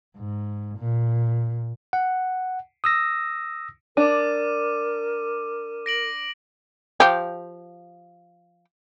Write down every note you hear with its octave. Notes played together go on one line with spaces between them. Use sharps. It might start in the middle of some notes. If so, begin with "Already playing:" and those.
G#2
A#2
F#5
D#6 E6 A#6
D4 A#4 D6 D#7
A#6 D7 F#7
F3 G4